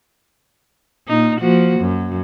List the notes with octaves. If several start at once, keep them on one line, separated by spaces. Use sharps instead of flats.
A#2 D#4
F3 A#3 F#4
F#2